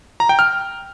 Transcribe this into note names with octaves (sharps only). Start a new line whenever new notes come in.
A#5
G5
F6